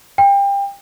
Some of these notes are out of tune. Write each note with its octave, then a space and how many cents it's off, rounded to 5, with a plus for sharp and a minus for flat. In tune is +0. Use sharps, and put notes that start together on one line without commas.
G5 +30